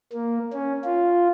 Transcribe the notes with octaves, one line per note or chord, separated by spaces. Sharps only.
A#3
C#4
F4